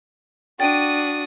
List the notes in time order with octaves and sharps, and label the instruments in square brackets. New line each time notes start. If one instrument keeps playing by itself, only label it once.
[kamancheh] D4 [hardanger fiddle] F#4 D#6 [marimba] G5 [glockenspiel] A6 D7 D#7